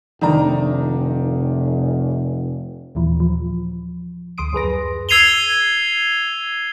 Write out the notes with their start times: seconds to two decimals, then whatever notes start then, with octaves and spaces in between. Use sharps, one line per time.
0.21 F1 D#3 D4 A#5
2.95 D#2 A#2 E3 F3
3.20 F3
4.38 D2 C6 D#6 D7
4.53 F#2 G#4 B4 A#6
5.09 E6 G#6 C7 D#7 F7 G7